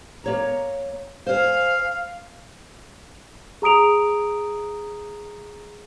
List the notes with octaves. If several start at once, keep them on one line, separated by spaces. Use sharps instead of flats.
A#3 C#5 A#5
C5 F5 G#5
G#4 A#5 D#6 D7 F7